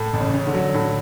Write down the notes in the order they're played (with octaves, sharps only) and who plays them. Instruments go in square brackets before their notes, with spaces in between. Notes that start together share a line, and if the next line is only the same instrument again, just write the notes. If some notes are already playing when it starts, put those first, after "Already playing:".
Already playing: [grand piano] A2
A1
[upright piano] C#3
[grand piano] C#4
[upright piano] D3
[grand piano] F#3
[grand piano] A2 [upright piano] D3